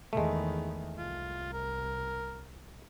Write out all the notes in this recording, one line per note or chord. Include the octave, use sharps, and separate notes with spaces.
E2 D#3 G#3 A3
C2 F4
A#4